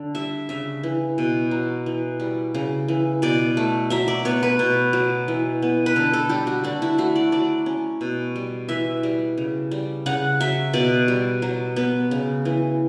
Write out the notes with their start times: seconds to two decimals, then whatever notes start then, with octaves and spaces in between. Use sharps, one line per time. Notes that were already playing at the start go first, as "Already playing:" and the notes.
Already playing: D3
0.15 G3 E5
0.49 C#3 E5
0.83 E3
1.18 B2
1.51 F#3
1.86 E3
2.20 G3
2.55 C#3
2.88 E3
3.22 B2 D5
3.57 A3
3.90 F#3 E5
4.08 D5
4.25 B3 C#5
4.43 B4
4.59 B2
4.93 F#3
5.28 E3
5.62 B3
5.86 B4
5.96 D3 A4
6.13 A4
6.29 G3 G4
6.47 F#4
6.64 D3 D4
6.82 E4
6.98 A3 F#4
7.16 D5
7.32 F#3 D5
7.66 C#4
8.01 B2
8.36 G3
8.69 E3 E5
9.03 G3
9.38 C#3
9.71 G3
10.06 C#3 F#5
10.40 F#3 E5
10.73 B2 D5
11.08 G3
11.42 F#3
11.76 B3
12.11 C#3
12.45 E3